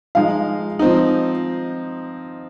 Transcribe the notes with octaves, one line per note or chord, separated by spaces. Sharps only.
F3 G#3 D#4 F5
F3 C4 D#4